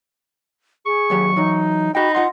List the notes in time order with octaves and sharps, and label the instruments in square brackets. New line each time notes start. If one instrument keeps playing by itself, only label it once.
[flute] G#4 [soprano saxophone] C#6
[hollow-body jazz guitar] D#2 F#3 G4
[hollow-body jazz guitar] E3 F#3 [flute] D#4
[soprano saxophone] D#4 [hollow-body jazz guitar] F#4 G5 [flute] B5
[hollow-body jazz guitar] F4 D#5 C6 [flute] F#5